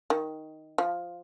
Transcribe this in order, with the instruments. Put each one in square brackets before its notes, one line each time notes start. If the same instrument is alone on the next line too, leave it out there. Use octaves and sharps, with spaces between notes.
[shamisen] D#3
F3